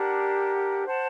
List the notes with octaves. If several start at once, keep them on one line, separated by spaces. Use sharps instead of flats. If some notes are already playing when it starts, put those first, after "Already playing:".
Already playing: D4 G4 A#4 F#5
C5 F#5 A5